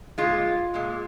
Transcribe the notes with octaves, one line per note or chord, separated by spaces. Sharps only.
A#2 G#3 F4
A#2 G#3